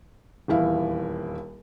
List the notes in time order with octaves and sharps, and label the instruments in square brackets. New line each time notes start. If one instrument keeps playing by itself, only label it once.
[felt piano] D#1 E2 E4 F5